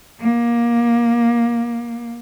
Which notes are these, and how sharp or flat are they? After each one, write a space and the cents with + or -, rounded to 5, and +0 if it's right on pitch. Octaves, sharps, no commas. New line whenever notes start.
A#3 +20